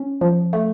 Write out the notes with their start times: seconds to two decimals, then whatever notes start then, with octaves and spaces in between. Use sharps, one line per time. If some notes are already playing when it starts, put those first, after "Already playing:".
Already playing: C#4
0.21 F3
0.53 A3